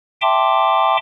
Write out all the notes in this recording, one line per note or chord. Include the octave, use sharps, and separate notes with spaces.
E5 G5 A5 C6 D6